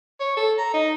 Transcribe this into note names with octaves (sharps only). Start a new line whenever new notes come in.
C#5
A4
A#5
D#4